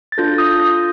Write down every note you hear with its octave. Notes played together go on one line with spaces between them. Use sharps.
A6
D4 F4 A4 G6 A#6
D#6 G6
G6 A#6